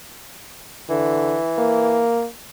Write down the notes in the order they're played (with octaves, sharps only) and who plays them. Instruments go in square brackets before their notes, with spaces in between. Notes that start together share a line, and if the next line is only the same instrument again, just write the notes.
[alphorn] D3 [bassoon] E3
[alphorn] A#3